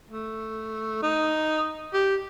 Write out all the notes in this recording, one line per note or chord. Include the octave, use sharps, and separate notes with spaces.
A3
D#4
G4